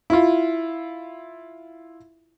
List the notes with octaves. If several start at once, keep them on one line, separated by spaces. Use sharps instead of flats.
E4 F4